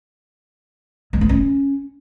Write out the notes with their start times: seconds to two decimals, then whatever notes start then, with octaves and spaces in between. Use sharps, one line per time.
1.13 G#3
1.21 A3
1.29 C#4